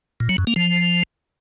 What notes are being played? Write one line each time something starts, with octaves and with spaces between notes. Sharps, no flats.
A#2
F#3
F#2
A#3
F3